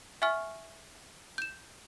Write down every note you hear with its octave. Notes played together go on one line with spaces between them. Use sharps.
E5 F#5 G#5 C#6 F6
G6 E7